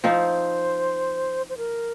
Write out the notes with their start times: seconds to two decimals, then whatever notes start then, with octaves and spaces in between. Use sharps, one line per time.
0.04 F3 C4 D#4 C5
1.49 C5
1.58 A#4